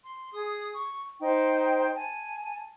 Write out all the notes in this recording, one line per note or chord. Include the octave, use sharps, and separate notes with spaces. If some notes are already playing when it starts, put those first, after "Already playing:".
C6
G#4 D#6
C#6
D#4 C5 G5
G#5 A5